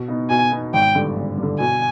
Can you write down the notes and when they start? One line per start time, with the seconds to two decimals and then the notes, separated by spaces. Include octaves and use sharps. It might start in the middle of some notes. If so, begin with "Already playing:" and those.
Already playing: B2
0.08 B3 D#4
0.30 B2 G#5
0.52 B3 D#4
0.73 G#1 G5
0.95 G2 D3
1.16 G#1
1.37 G2
1.43 D3
1.59 B2 G#5